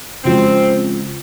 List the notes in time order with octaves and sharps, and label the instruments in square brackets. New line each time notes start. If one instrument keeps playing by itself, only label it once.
[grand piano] C#3 F3 G#3 [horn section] C4